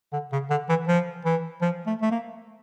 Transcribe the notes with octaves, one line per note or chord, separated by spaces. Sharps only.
D3
C#3
D3
E3
F3
E3
F3
A3
A3
A#3